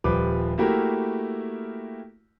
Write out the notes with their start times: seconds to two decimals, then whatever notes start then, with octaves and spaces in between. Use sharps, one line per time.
0.04 D#1 F3 G3 B4 D6
0.58 A3 A#3 E4 F#4 G4 A#4